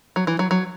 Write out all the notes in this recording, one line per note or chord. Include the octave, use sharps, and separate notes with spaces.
F#3
E3
F#3
F#3